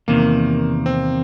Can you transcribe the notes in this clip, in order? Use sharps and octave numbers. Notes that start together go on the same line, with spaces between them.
E2 C3 D#3 A#3
C4